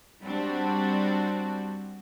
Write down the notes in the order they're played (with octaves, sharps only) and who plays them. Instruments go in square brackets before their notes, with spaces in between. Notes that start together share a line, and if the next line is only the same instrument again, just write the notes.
[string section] G3 C4 D4 F#4